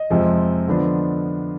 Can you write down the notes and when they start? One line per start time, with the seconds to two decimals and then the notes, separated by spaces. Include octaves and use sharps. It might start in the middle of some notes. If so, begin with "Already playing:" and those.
Already playing: D#5
0.10 F2 C3 F3 G#3 C4
0.68 D3 F3 B3 D4